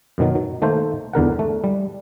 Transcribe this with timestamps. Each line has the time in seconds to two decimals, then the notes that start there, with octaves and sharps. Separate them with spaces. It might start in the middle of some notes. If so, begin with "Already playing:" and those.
0.18 F#2 B2 D#3 F#3
0.35 F#3
0.62 D#3 A3 A#3 A4 C5
1.13 E2 D3 A#4 F#5
1.39 A3
1.64 G3